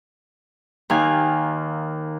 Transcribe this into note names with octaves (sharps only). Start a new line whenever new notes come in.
D#2 D#3 F5 G#5